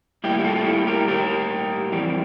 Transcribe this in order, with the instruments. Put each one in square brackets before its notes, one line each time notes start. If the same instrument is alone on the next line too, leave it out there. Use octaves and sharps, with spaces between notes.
[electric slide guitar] A2 G3 A#3 E4 G4
G4
F4 A4
A4
E4 G4
G4 A#4
G4 A#4
F2 E3 G3 C4